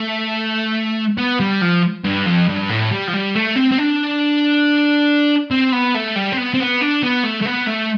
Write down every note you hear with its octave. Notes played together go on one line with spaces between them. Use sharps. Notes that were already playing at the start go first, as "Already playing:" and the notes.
Already playing: A3
B3
G3
F3
G2
F2
G2
A2
G3
F3
G3
A3
C4
C4
D4
C4
B3
A3
G3
C4
B3
C4
B3
D4
B3
A3
A3
B3
A3